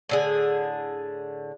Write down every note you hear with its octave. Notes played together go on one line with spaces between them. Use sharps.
A2 D3 G#4